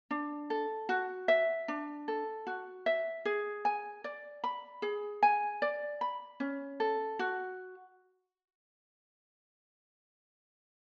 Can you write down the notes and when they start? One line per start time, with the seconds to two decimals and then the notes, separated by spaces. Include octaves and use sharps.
0.11 D4
0.50 A4
0.89 F#4
1.28 E5
1.68 D4
2.08 A4
2.47 F#4
2.86 E5
3.25 G#4
3.65 G#5
4.04 D5
4.44 B5
4.82 G#4
5.23 G#5
5.62 D5
6.01 B5
6.40 C#4
6.80 A4
7.19 F#4